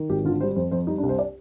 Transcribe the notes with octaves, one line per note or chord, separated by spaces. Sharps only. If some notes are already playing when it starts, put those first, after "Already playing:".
Already playing: D#3
G#1 G4
D3 F4
G3 C5
F2 C5
F2 C5
G3 D#4
D4
C2
C5
D5